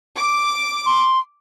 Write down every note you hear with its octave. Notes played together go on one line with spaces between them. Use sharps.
D6
C6